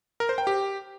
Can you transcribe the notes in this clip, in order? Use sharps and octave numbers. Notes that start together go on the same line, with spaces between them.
A#4
C5
G5
G4